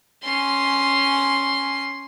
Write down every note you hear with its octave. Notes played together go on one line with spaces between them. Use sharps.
C#4 C6